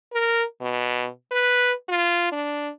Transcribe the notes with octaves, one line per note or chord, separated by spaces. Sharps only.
A#4
B2
B4
F4
D4